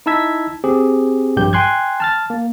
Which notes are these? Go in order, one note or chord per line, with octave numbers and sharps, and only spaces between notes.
D#4 E4 A5 E6 G#6 B6
C4 G4 G#4
A#1 G2 G4 G6
G5 G#5 C6 F#6 G#6
A5 F6 A6
A#3